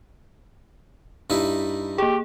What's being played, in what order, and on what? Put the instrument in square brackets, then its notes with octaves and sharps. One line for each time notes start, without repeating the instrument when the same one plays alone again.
[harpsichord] G2 D#4 E4
[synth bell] A#3 G#4 [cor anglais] G4